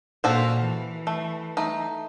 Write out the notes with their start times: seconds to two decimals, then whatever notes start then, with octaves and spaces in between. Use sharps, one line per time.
0.24 A#2 F#4 A4 C5 F5
0.59 E3
1.07 A3
1.57 A3 D#4